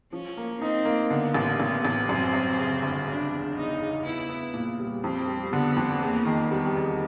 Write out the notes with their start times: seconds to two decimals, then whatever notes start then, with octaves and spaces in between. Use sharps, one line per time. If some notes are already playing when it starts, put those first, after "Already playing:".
0.12 F3 C#4
0.37 A#3
0.61 C4 D#4
0.85 A#3
1.10 D3 B3
1.34 A1
1.59 A1 B3
1.85 A1
2.09 F#2 C4
2.34 F#2
2.57 C#3
2.82 G1
3.06 C#3 D4
3.32 E2
3.56 E2 D#4
3.80 C#3
4.05 B3 E4
4.29 B3
4.54 A#2
4.79 G3
5.03 F2 C4
5.27 G3
5.53 D3 B3
5.76 F2
6.01 E2 A#3
6.25 D#3
6.51 G3 B3
6.75 E2